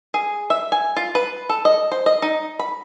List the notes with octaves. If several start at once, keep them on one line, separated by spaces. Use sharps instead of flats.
G#4
E5
G#5
F4
B4
A4
D#5
C5
D#5
D#4
B5